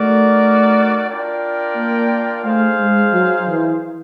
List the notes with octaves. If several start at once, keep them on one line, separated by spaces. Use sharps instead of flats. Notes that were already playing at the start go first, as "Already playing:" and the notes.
Already playing: A3 D#4 F#4 A#4 D5
D4 F4 A#4 D5 G5
A#3
A3 D#4 G#4 C5 F5
G#3
F#3
E3